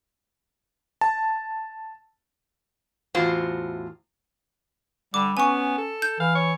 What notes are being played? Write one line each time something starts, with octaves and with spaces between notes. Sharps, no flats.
A5
E2 A2 F4 F#4 C5
D3 G3 D6
B3 C#4 G#5 C#6
A4
G6
E3 F5
C#5